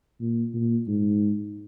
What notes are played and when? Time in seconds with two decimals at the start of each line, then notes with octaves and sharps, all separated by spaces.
0.20 A#2
0.54 A#2
0.88 G#2